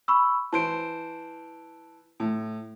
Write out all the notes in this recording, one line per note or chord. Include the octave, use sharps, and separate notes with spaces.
B5 C#6 E6
E3 C5 A5 D7
A2